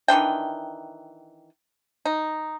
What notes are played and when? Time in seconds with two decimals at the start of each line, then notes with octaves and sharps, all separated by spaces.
0.08 D#3 E3 D4 G5
2.05 D#4